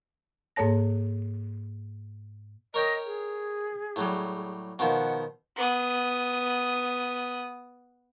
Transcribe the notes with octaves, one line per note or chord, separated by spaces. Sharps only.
G#2 A#3 A4 C#5 A5 A#6
A#4 C#5 D#5 G5
G#4
A2 F#3 G3
B2 D#3 F3 F#5
B3 D#6